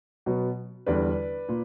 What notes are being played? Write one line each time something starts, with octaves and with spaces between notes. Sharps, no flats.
B2 F#3 B3
E2 D3 G3 B4 D5
A#2